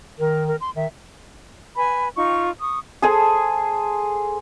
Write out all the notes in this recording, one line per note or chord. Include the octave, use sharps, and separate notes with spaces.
D#3 A#4
A#4
C6
D#3 E5
B4 G#5 B5
D#4 F4 C#6
C#6 D#6
G#4 A4 C5 G#5